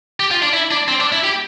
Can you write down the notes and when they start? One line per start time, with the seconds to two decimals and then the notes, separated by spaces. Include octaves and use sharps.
0.20 G4
0.31 F4
0.42 D4
0.54 E4
0.71 D4
0.88 C4
1.00 D4
1.12 E4
1.24 G4